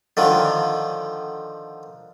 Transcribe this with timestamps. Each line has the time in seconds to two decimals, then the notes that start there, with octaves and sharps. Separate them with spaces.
0.17 D3 D#3 F3